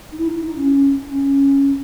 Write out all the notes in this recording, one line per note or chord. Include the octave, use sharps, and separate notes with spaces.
D#4
E4
D#4
E4
D#4
C#4
C#4